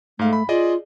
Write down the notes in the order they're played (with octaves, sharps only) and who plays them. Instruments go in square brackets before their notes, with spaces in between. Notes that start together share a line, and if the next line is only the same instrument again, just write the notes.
[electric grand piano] G#2 F5 [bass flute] A3
[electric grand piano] B5
[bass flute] F4 [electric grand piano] G#4 D5 D#5